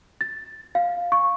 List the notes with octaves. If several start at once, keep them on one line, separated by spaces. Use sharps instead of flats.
A6
F5
C#6